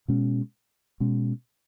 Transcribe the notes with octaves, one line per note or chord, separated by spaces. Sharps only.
B2 G#3 C#4
B2 G#3 C#4